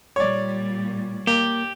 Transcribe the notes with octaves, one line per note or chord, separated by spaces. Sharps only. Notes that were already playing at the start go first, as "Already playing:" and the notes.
A#2 G3 C#5 D5
A#3 G4